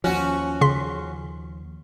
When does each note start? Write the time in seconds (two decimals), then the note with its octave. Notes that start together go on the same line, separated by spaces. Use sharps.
0.04 D#2 F3 C#4 F#4
0.61 C#3 C6 B6